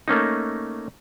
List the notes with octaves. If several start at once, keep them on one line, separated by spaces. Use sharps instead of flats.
A3 A#3 C#4 D#4